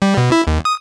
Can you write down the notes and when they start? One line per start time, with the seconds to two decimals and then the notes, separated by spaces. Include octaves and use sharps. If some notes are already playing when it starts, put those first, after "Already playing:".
0.02 G3
0.17 B2
0.32 E4
0.47 D#2
0.65 D#6